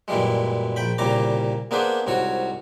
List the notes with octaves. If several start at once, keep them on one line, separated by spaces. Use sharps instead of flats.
F#2 A#2 E3 G3 G#3
A#1 G5 B5
C2 A#2 C#3 G3 A#5 D6
A#3 B3 D4 G#4 B4 C5
C2 G#2 F#4 C#5